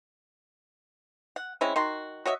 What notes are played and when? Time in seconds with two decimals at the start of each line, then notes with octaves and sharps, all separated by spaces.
1.36 F#5
1.61 G#3 C4 C#4 E4
1.76 D#3 F#4 C6
2.25 F#4 C#5 D#5 E5